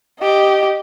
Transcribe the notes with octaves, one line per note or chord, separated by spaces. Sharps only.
G4 D#5